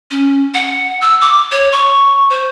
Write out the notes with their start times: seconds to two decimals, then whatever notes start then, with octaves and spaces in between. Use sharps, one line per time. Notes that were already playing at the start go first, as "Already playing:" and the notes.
0.11 C#4
0.54 F#5
1.01 E6
1.21 D6
1.52 C#5
1.72 C#6
2.30 C5